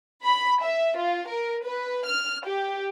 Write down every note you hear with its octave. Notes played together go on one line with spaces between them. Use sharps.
B5
E5
F4
A#4
B4
F6
G4